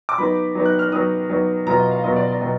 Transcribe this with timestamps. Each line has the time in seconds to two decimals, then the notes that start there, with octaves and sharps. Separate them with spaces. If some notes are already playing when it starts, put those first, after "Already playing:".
0.09 D6
0.18 F#3 B3 D#4 B5
0.55 F#3 B3 D#4
0.65 F#6
0.79 F6
0.92 F#3 B3 D#4 D#6
1.29 F#3 B3 D#4
1.66 B2 F#3 B3 F4 A#5
1.79 D#5
1.91 F5
2.04 B2 F#3 B3 F4 D#5
2.16 D5
2.29 D5
2.40 B2 F#3 B3 D#5